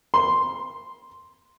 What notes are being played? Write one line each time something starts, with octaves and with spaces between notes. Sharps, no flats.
C6